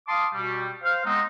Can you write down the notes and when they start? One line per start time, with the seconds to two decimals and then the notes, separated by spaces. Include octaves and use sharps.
0.08 F5 A5 C6 D6 D#6
0.33 B2 G3
0.83 C5 F5
1.05 G#3 B3 C4 D#4